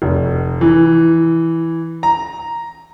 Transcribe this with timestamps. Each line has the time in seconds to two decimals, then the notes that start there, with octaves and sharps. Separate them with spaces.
0.02 F1
0.61 E3
2.03 A#5